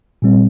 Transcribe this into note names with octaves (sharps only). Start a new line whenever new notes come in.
A#2 G3 C4